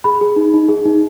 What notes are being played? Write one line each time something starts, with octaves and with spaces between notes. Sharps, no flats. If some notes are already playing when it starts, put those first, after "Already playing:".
G#4 B5
G#4
D#4
D#4
G#4
D#4